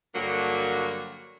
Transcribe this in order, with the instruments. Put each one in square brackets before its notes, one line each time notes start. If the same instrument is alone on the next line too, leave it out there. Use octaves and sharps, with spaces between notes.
[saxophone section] G2 D3 F#3 G3 A#3 F#4